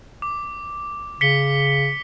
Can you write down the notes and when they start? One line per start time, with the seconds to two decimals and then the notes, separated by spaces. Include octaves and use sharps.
0.22 D6
1.21 C#3 B6 C#7 G7